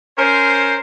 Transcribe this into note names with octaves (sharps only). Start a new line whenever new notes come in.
C#4 A#4 C5